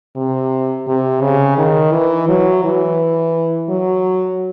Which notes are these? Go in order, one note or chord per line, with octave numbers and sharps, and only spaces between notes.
C3
C3
C#3
D#3
E3
F#3
E3
F#3